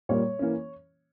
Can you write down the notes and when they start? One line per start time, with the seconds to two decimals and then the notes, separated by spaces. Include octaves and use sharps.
0.09 A#2 G3 A#3 C#5
0.39 E3 A#3 C#4